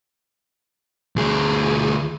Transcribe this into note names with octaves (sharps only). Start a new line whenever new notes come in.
D2 G#4